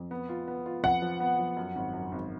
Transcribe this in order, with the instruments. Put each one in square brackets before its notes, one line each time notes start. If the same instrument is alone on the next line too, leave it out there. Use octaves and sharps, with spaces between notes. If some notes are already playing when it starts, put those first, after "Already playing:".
Already playing: [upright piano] F2
B3
F4
B3
F4
[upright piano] F2 [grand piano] F#5
[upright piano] F3
B3
F3
F#2
G#1
F#2
G#1